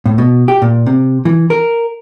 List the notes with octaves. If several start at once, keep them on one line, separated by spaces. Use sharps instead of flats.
A2
B2
G4
A#2
C3
E3
A#4